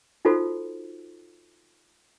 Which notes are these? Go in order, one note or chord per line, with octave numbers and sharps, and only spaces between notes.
D#4 F4 F#4 A4 C5